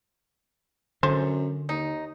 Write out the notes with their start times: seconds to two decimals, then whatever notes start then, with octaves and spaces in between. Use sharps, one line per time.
1.03 F#2 D3 C5
1.69 D#2 D#4